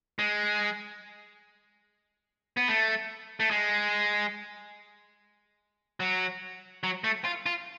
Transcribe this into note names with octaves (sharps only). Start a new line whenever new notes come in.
G#3
B3
A3
A3
G#3
F#3
F#3
A3
F4
F4